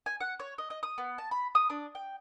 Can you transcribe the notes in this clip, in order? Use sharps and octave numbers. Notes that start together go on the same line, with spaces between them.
G#5
F#5
C#5
D#5
D#5
D#6
B3
A5
B5
D#6
D4
G5